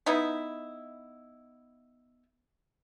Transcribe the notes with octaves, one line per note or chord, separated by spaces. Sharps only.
B3 D#4 E4